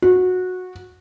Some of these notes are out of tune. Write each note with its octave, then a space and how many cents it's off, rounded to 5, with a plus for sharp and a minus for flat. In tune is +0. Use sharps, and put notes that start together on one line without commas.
F#4 -15